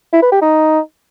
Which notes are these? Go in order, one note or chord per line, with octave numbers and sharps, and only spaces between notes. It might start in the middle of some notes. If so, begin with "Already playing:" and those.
E4
B4
G4
D#4